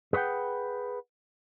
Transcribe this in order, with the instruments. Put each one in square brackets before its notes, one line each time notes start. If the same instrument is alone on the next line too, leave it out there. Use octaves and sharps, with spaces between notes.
[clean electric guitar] G#4 B4 C#5 F#5 G5